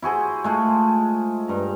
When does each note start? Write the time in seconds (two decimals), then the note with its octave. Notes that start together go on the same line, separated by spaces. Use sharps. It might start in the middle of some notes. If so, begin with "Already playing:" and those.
0.02 E4 F#4 G#4 C5
0.44 G#3 A3 F4
1.48 G2 A#5